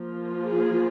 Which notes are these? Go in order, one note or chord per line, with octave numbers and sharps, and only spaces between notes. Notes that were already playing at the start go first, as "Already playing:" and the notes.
Already playing: F3 A#3 F4
G#4